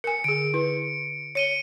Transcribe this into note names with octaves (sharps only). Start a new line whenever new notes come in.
A#4 G#5 C#7
D3 G#4 D7
E4 B4
C#5 C#7 D#7 G7